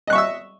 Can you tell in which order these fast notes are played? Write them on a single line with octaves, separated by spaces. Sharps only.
D#5 F#6 C#6 E5 E6